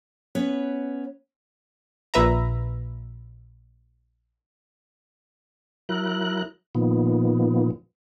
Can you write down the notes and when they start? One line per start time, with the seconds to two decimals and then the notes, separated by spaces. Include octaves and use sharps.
0.35 B3 C#4 B4 C#5
2.14 A#1 A#2 B4 E5 A#5
5.89 F#3 E4 A#4 F#6
6.75 A#2 D#3 F3 B3